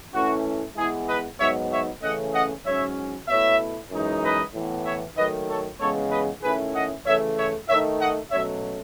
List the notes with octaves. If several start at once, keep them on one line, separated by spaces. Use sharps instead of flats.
E3 A3 C#4 E4 F#4
E3 G#3 B3 E4 G#4
B4 D#5
G#2 F#3 B3 D#4 C#5 E5
C#5 E5
C#3 E3 A3 C#4 D#5 F#5
D#5 F#5
G#2 F#3 C#4 C#5 E5
B2 A3 E4 C#5 E5
F#2 E3 G#3 D#4
B4 D#5
A2 E3 B3
C#5 E5
D#3 F#3 A3 B4 D#5
A4 C#5
C#3 E3 G#3 B3 A4 C#5
B4 D#5
D#3 A3 C#4 E4 G#4 B4
D#5 F#5
C#3 E3 A3 C#5 E5
C#5 E5
D#3 A3 D#4 C#5 E5
D#5 F#5
B2 F#3 A3 C#4 C#5 E5